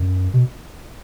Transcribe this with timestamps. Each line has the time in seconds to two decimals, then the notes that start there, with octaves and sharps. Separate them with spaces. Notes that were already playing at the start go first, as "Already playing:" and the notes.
Already playing: F#2
0.34 B2